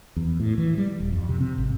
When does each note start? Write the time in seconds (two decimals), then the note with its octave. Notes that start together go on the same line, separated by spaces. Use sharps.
0.16 E2
0.40 A2
0.58 E3
0.78 G3
1.00 D1
1.12 F2
1.29 C3
1.41 C3
1.58 G#1